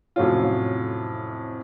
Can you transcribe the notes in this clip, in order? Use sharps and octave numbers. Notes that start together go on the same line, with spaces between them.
F2 A2 C3 F#3 C#4 F4